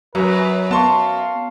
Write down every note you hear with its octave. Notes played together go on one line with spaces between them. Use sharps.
F#2 F#3 B4
B3 F5 A5 C6 C#6